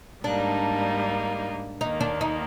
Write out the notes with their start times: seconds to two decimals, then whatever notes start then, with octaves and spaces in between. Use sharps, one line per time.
0.24 G#2 G3 A#3 D4 D#4
1.81 D#2 D#3 A#3 D#4
2.01 D4
2.21 D#4